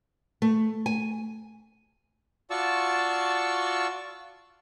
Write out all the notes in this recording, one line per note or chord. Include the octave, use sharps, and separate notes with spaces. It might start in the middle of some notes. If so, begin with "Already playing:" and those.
A3
G#5
F4 F#4 D5 A5 C#6 E6